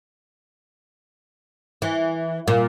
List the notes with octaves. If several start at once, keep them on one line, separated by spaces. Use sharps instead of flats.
E3
A#2